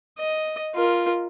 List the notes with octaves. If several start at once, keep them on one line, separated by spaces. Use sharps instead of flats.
D#5
F4 A#4